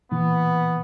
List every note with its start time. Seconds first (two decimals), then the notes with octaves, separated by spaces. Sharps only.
0.12 A#2 E3 B3